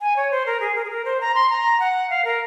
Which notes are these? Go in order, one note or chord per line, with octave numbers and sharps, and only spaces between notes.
G#5
C#5
C5
A#4
G#4
A#4
G#4
A#4
C5
A#5
C6
A#5
F#5
F5
A#4